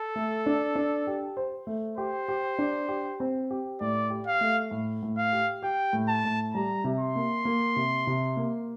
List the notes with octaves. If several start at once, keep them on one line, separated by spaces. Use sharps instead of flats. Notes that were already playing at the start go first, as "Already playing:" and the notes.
Already playing: A4
A3
D4
D4
G4
C5
A3
G4 C5
G4
D4
G4
C4
G4
A2 D5
G4
F5
A3
A2
A2
F5
G4
G4 G5
A2
A5
A2
G3 A#5
C3
C6
A#3
A#3
C3
C3
A#3